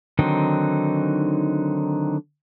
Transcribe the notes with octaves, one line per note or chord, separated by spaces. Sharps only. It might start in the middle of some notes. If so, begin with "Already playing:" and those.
D3 D#3 F#3 C4 D#4